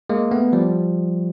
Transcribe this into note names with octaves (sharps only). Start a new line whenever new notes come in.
G#3 A#3
A3 B3
F3 G3